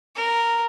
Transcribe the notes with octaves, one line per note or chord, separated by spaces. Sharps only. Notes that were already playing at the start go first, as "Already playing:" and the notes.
A#4